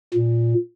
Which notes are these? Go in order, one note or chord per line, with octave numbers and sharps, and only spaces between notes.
A#2